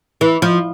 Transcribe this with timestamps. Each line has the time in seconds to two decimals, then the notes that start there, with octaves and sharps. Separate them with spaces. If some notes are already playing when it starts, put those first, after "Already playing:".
0.21 E3
0.42 F3